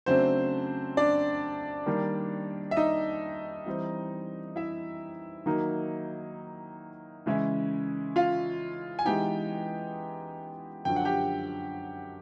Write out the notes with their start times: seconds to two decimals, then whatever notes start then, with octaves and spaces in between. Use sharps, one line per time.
0.06 C#3 F#3 A3 C4 D4 C5
0.97 D4 D5
1.86 D#3 G3 A#3
2.71 E5
2.77 D#4 D#5
3.66 E3 G3 C4
4.56 E4 E5
5.46 D#3 F#3 A#3 D#4
7.26 C#3 E3 G#3 C#4 E4
8.16 F4 F5
8.99 G#5
9.05 E3 G#3 B3 D#4 G4 G5
10.85 F#2 D3 F3 G5
10.96 F#5
11.05 G4 G5